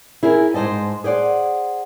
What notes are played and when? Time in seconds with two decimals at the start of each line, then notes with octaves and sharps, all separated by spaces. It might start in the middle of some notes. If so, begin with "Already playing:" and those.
0.23 E4 G#4 A#4
0.54 G#2 C3 C5 D#5 A5
1.04 G#4 C5 D5 F#5